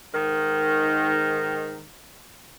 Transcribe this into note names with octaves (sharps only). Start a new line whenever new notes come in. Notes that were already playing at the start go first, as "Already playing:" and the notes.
G#2 D#3